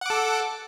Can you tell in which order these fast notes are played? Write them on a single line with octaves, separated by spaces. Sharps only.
F#5 D6 A4